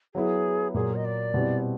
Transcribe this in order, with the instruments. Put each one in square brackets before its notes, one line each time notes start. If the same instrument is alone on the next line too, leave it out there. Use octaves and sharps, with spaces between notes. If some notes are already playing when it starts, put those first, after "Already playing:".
[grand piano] F#3 B3 E4 [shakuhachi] G#4
[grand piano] A#2 F#3 A#3 [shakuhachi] G#4
[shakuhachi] D#5
D5
[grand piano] B2 G3 C4 E4